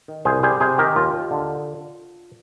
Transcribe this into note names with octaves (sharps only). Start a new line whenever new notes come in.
D#3
C2 G#4 C5
G3 G#4 C5
C3 G#4 C5
D#3 G4 A#4
D#2 F4
D#2
D3